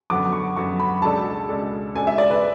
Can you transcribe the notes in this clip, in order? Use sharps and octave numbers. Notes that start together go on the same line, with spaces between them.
F#2 D3 F#3 B3 F#4 D6
C#6
F#2 D3 F#3 B3 F#4 C#6
B5
C#2 B2 G#3 D4 A4 A5
C#2 B2 G#3 D4 A4
C#2 B2 G#3 D4 A4 G#5
E5
D5
B4